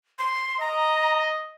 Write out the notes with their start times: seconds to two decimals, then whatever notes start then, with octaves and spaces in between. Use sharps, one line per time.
0.19 C6
0.60 D#5 A#5